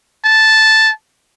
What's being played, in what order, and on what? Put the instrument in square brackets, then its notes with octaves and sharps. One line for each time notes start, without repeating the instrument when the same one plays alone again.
[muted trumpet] A5